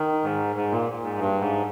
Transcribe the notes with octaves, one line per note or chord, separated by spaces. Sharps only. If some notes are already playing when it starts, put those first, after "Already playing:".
Already playing: D#3
G#2
G#2
A#2
G#2
G2
G#2